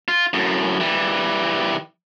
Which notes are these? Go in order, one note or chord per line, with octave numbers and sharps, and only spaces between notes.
F4
F#2 A2
E3 G3